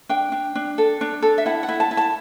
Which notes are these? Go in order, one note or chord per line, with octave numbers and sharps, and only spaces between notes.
D4 G5
D4
D4
A4
D4
A4
E5
E4 F#5
F#5
E4
A5
E4
A5